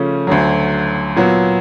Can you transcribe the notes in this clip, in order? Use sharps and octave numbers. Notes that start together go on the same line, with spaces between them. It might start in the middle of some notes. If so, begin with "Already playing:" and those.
Already playing: C#3 F3 A3 C#4
D2 D3 F#3
A#2 F#3 B3